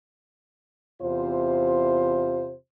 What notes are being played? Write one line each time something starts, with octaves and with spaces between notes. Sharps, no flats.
E2 C3 F4 C5